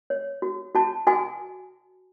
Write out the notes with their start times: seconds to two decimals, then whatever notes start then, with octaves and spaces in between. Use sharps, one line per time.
0.10 C#5
0.42 F#4
0.75 F#4 A5
1.07 F#4 G#5